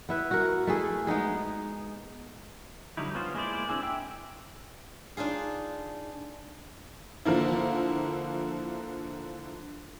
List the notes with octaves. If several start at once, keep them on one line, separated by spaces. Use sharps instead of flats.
B3 E4 B4
F#4 A#4
A3 E4 G#4
G#3 B3 D#4 G#4
D3 F#3 G3 D#4 E4
B3 C#4 F4 C5
G#3 A#3 E4 C5 D5
C4 D4 E4 G#4
E5 G5 E6
D4 D#4 F4 G#4
D3 F3 A#3 E4